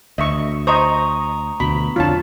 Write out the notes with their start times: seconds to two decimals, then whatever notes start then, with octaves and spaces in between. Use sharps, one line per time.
0.18 D2 D#5 E5 C#6
0.67 C5 D#5 A#5 C#6 D#6
1.60 D2 B2 B5
1.96 F2 D3 F3 F4 C#5 A5